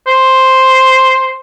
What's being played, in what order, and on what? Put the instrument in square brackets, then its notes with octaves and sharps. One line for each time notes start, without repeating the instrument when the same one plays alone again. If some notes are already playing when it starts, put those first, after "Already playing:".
[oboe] C5